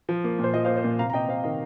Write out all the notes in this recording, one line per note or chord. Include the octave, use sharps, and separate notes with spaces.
F3
A#3
A#2
C5
F3 D#5
C5 F5
A#3
C5
A#2
C3 F5 A#5
A#5
C3 D#5 G5
C3 C5 F5
D#3 D#5